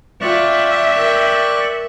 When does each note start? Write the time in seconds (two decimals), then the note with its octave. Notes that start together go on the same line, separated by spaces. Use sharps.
0.22 F4 D5 E5 G5 C#6 F#6
0.96 A#4 G5